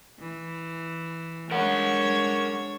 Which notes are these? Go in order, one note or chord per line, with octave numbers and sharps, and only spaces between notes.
E3
G#3 D4 A#4 C#5 F#5